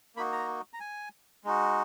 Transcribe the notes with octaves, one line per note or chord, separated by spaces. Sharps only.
A#3 D#4 F#4 B5
A#5
A#5
G#5
G#3 D#4 F#4